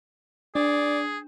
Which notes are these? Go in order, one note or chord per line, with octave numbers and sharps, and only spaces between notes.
D4 G#4 D5